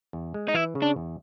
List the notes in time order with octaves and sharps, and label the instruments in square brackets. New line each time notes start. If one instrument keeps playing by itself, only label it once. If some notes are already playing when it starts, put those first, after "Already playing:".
[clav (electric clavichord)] E2
G#3
[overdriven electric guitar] D#4
[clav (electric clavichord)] E3 [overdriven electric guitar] E4
[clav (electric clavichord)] C#3
[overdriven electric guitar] D4
[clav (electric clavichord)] E2